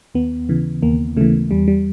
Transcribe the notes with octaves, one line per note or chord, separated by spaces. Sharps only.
D#2 B3
C#3 E3
D#2 A#3
C#3 E3 A3
E2 G3
G3